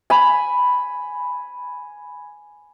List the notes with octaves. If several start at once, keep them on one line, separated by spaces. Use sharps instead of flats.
G#5 B5